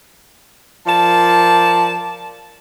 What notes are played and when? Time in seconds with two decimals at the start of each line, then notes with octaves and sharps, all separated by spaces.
0.87 F3 A#4 D5 A5